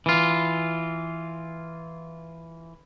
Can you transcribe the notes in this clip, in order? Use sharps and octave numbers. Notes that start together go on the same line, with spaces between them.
E3 F4